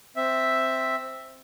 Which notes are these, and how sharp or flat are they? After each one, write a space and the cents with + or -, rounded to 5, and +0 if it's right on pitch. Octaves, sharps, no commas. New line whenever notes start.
C4 +0 E5 +0